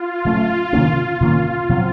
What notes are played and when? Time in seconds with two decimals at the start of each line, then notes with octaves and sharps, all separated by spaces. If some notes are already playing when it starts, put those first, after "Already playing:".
Already playing: F4
0.25 C#3 F#3 A3 C#4
0.73 C3 D#3 A#3 C#4
1.20 C3 D#3 A#3 C#4
1.69 C3 F#3 C4